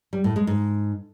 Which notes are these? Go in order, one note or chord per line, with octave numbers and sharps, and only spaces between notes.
G3
A2
G#3
G#2